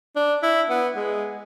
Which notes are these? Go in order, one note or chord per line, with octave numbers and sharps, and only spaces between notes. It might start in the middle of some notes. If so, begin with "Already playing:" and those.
D4
E4
B3
G#3